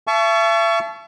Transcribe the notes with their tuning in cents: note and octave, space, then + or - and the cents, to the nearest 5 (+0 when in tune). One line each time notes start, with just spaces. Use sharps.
E5 +40 A5 -25 C#6 +20